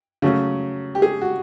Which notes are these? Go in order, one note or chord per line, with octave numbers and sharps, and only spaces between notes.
C#3 F#3 A3 C#4
G4
G#4
F#4